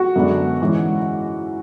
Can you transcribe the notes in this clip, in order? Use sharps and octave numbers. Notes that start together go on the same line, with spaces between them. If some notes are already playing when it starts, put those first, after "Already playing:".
Already playing: F#4
F#2 D3 G#3 B3 D4
G#2 E3 G#3 C#4